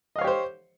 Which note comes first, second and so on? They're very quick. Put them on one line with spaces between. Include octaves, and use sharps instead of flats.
D#5 F5 C#5 G4 C5